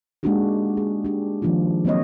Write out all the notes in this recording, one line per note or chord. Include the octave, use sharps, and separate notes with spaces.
G#3 A#3 D4 D#4 F#4 G4
G#4
D4 G4
D#3 F3 A#3 D4 F4
F#3 A#3 C4 C#5 D#5